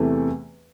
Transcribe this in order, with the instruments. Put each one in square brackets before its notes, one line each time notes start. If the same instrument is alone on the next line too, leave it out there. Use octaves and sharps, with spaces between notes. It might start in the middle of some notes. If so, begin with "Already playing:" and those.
Already playing: [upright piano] E2 C3 E3 A3